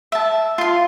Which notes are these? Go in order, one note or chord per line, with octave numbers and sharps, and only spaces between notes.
E5 A5
F4 C6